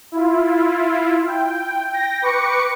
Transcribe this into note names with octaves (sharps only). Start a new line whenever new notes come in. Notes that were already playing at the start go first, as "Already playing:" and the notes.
E4 F4
G5
G5 A#6
B4 C#6 D6 C#7